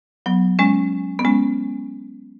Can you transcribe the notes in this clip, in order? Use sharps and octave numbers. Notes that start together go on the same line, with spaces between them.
F#3 B3
G#3 C#4
B3
G#3 C#4